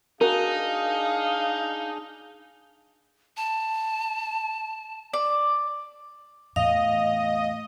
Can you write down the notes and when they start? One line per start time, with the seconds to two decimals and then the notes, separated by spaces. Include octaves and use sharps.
0.21 D4 D#4 F#4 G#4 A#4 F5
3.37 A5
5.13 D5
6.56 E2 A2 D#5 F5